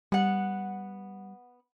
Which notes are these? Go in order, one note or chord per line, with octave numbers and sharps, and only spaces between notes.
G3 B3 F#5